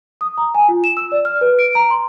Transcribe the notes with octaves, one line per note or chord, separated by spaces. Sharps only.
D#6
A#5
G#5
F4
E7
E6
D5
F6
B4
D7
A#5
C6